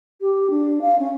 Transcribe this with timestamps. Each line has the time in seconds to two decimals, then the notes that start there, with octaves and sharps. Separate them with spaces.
0.21 G4
0.50 D4
0.82 F5
0.99 C#4